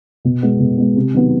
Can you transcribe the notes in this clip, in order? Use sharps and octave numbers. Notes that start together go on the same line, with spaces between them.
B2
G#3 B3
B2
G#3 B3
C3
D#3 F#3 B3